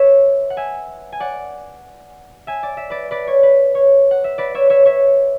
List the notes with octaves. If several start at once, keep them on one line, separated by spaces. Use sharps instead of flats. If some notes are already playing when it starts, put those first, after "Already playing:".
Already playing: B4 C#5 E5
F#5
E5 G#5
G#5
D5 F#5
E5 G#5
D5
E5
B4 D5
B4 D5
C#5
B4
C#5
F#5
E5
B4 D5
C#5 E5
C#5 E5
C#5 E5